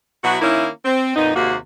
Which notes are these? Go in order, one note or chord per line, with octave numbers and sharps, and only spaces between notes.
B2 F#3 E4 F#4
D#3 A#3 C#4 E4
C4
F2 A#2 B3 D#4
D#2 C3 G#3 A#3 F#4